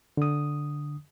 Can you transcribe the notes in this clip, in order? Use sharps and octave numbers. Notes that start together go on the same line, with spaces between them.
D3 D#6